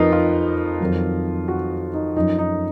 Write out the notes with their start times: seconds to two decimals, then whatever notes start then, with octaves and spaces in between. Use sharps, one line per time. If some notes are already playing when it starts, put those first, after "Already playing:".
Already playing: F2 F3 D#4 F4 A#4 B4
0.13 F4
0.80 F2 D#3 F#3
1.48 F#4
1.94 D#4
2.16 F#2 F3 D#4
2.38 D#4